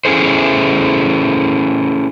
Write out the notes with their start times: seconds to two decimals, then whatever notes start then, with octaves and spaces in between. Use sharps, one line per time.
0.05 C#4 E4 G#4 A4 C5